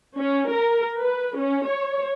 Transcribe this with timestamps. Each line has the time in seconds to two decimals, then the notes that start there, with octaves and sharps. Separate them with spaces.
0.16 C#4
0.49 A#4
0.99 B4
1.37 C#4
1.68 C#5